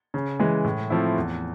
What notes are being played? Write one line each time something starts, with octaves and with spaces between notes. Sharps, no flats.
C#3
E3 G#3
A2
F3 A3 C4 E4
E2